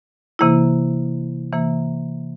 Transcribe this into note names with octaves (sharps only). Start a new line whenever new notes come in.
C3 E3 A#3 E4
C3 E3 A#3